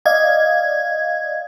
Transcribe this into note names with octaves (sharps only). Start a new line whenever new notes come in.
D5 D#5 F5 G#6